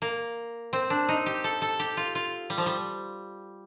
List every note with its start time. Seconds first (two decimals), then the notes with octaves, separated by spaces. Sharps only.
0.02 A#3
0.73 C4
0.90 D4
1.09 D#4
1.26 G4
1.44 A4
1.62 A4
1.79 G4
1.97 F4
2.15 F4
2.50 G3
2.58 F3
2.66 G3